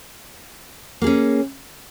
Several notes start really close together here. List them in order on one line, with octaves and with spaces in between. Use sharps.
A#3 G#4 C#4